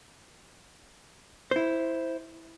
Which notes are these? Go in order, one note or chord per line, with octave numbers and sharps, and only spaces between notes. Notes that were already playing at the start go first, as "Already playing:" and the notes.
E4 C5